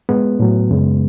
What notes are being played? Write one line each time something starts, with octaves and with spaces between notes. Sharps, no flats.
G#2 G#3 B3
A2 F#3
F#2 C#3 G#3